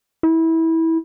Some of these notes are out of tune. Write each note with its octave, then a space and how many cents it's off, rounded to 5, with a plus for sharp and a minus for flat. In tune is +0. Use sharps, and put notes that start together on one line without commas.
E4 -20